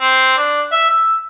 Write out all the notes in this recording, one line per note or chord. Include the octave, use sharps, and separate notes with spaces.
C4
D4
E5
E6